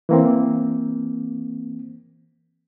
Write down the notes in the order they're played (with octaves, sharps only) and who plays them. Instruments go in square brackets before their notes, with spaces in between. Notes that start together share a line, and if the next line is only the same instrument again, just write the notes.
[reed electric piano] E3 A#3 C4